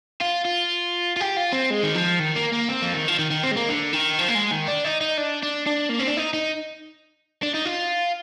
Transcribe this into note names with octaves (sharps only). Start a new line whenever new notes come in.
F4
F4
F4
G4
F4
C4
G#3
D#3
F3
D#3
A#3
A#3
C4
F3
D#3
F3
D#3
D#3
C4
G#3
A#3
D3
D#3
F3
A#3
G#3
D#3
D4
D#4
D#4
D4
D4
D4
A#3
C4
D4
D#4
D#4
D4
D#4
F4